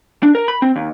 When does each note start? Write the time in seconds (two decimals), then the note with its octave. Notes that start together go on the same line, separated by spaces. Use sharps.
0.23 D4
0.35 A#4
0.48 B5
0.62 C4
0.76 D#2